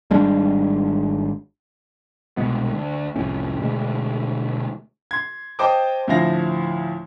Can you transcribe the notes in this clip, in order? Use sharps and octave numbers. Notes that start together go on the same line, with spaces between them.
G#1 G3 G#3 D4
C2 B2 G#3 B3
D2
C2 F2 A2 C#4
D2 B2 G#3 A3
C6 G#6
C5 D#5 G5 A5 D6 D#6
D2 A2 F3 E4 F5 A#6